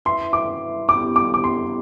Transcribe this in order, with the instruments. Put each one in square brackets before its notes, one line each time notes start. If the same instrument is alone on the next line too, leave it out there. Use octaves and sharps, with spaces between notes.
[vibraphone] E4 B4 E5 [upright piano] C6
[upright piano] D6
[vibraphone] B3 E4 G4 [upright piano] D6
[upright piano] D6
D6
C6